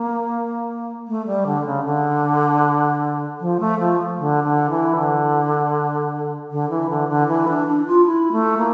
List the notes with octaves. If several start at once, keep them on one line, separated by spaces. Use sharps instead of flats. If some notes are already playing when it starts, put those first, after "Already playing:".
Already playing: A#3
A3
G3
D3
C#3
D3
F3
A3
F3
D3
D3
E3
D3
D3
E3
D3
D3
E3
D4
D4
F4
E4
A3
A#3